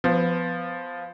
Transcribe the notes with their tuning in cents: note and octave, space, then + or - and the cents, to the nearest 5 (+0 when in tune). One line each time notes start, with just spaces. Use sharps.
F3 +0 B3 +25